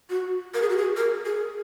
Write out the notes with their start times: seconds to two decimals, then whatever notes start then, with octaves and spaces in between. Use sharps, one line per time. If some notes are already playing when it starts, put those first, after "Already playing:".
0.10 F#4
0.54 A#4
0.62 G#4
0.69 F#4
0.78 G#4
0.97 A#4
1.26 G#4